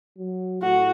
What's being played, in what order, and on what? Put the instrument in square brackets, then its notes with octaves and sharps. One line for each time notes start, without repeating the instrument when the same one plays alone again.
[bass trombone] F#3
[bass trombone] A2 [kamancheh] F#4